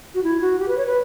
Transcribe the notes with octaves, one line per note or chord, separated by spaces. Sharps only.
F#4
E4
F#4
G4
B4
C#5
B4